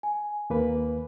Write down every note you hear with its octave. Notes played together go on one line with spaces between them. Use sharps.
G#5
D#2 A#3 B4